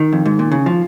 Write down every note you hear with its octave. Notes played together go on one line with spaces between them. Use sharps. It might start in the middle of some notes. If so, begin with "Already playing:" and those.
Already playing: D#3
F2
G#2
A#2
C#3
F3